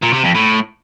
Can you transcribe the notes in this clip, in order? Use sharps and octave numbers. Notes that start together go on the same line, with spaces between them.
A#2
C3
F2
A2